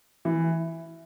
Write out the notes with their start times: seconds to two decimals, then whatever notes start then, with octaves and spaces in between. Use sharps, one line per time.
0.25 E3